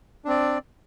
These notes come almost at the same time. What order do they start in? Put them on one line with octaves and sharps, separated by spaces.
D4 C4 D5